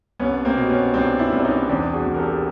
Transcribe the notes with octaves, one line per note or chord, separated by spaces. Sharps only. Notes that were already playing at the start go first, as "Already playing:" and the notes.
C2 B3 C#4
A#3 C4
B2
B3 C#4
C2 C4 D4
D4 E4
C2
D4
C#4 D#4
E2 C4 D4
F#4 G#4
E2
A#4
G4 A4
G#4